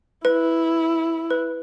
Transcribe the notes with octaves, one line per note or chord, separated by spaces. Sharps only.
E4 B4
B4